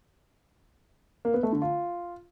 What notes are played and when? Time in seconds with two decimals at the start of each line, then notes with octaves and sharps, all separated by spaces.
1.25 A#3
1.34 B3
1.43 A3
1.52 D3
1.62 F4